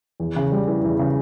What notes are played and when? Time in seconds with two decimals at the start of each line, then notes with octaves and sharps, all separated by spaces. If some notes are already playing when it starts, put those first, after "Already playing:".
0.20 E2
0.36 C#3
0.52 G3
0.68 E3
0.84 E2
0.99 C#3